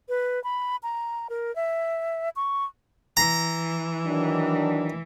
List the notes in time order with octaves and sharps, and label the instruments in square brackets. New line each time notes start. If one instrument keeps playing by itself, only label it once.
[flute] B4
B5
A#5
A#4
E5
C#6
[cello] E3 [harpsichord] A#5
[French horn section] D#3 F#3 D4